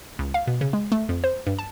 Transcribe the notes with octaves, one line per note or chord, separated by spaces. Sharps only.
C#2
F5
B2
C#3
G#3
A3
F2
C5
G2
A5